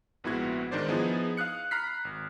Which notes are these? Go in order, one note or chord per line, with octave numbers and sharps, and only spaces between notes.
A#1 G#2 B3 E4 F#4 G#6
G#2 D#3 D4 C5 D5
F3 B3 D#4 E4 G#4
F5 D#6 F#6 C#7
A#5 B5 F6 F#6 B6 C7
G#1